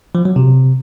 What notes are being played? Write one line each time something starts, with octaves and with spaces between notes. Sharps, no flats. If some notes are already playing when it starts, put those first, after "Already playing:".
F3
F#3
C3